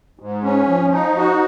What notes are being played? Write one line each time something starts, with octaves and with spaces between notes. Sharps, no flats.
G#2
C#4
F3
D#4
F#4